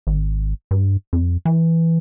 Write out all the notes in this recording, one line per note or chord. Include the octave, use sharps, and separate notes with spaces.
G#1
G2
F2
E3